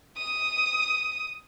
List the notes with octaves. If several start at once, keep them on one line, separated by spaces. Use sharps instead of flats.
D#6